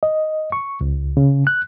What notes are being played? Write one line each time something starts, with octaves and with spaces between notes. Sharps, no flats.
D#5
C#6
C#2
C#3
F#6